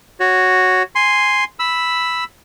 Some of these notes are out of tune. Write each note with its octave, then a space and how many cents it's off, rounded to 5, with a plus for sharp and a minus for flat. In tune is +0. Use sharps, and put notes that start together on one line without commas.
F#4 +0 C#5 +0
G#5 -5 C6 +0
B5 +0 E6 +0